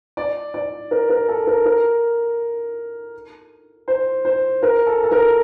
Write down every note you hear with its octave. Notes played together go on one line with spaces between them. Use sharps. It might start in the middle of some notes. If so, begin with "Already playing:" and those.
D5
D5
A#4
A#4
A4
A#4
A#4
C5
C5
A#4
A4
A4
A#4